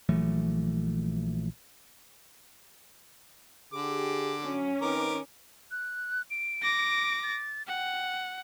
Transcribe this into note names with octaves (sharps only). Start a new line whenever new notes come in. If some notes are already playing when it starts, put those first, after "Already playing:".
A#1 E3 F#3 A3
D3 G4 G#4 D6
F#3 C#4
D#3 C4 D#4 A#4 B4 D6
F#6
D7
D6 A#6
A6
F#5 G5